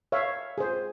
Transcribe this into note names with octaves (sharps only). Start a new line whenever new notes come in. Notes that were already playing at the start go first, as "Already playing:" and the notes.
C#5 E5 F5
G#4 C5